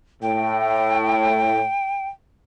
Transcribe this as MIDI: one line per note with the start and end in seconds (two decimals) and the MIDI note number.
0.22 1.63 45
0.22 2.07 79